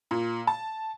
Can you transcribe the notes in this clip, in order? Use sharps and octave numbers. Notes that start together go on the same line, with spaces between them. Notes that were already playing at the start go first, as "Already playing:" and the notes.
A#2
A5